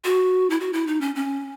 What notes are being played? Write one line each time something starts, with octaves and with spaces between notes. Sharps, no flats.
F#4
E4
F#4
E4
D#4
C#4
C#4